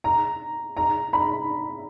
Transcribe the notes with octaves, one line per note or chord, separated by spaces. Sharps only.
A#5
A#5
B5